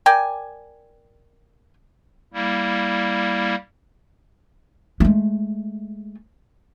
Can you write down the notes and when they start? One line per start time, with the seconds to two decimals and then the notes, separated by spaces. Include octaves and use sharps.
0.06 A#4 D5 G5 G#5
2.34 G3 A#3 E4
5.00 G#3 A3